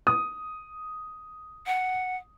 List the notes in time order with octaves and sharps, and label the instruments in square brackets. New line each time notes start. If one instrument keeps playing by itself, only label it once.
[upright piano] D#6
[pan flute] F#5